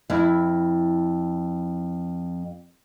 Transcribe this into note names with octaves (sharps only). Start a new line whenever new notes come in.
F2 E4